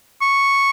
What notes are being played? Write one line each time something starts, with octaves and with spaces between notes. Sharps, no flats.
C#6